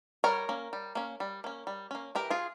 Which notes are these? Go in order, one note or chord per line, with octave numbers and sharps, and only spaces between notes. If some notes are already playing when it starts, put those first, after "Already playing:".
G3 A#4 C#5
A#3 C#4
G3
A#3 C#4
G3
A#3 C#4
G3
A#3 C#4
E3 G4 A#4
F4 G#4